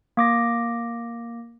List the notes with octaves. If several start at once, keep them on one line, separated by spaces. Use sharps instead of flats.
A#3 D6 A#6